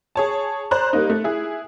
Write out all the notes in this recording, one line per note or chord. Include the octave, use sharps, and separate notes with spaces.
G#4 C#5 A5
C5 D5 A#5 B5 F#6
G3 A#3 D#4
A3
E4 G#4